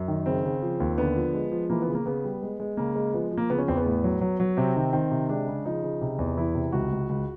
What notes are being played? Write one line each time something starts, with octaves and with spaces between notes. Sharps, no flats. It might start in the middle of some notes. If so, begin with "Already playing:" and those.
Already playing: F#2
D#3
C#3 C4
C#3
F3
D#2
D3 B3
F3
G#3
F3
E3 A#3
B3
C#3
A#3
C#3 B3
G3
G#3
G#3
C#3 A#3
G#3
F3 B3
F3
A#3
C#3 B3
C#4
E2 C4
B3
A2
F#3
F#3
F#3
C3 C4
D#3
D#3 C4
C3
G#3 D4
C#3
F3 D#4
C#3
C3
E2
E3 E4
C3
C#2 F#4
C#2
C#2